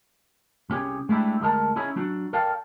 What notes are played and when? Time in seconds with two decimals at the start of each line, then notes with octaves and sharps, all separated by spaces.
0.70 C2 C#4 G4 G#4
1.09 G#3 A3 D4 E4 G4
1.40 D2 G#3 A3 A#4 A5
1.76 C#4 D#4 E4 G#4 C#5
1.96 F#3 D4 F#4
2.33 A4 A#4 D5 F5 G5 A5